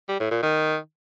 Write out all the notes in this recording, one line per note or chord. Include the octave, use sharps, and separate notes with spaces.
G3
A2
A#2
D#3